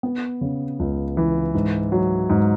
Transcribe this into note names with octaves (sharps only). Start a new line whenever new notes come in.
B3
C#3
C#2
E3
G#2
F#3
G#2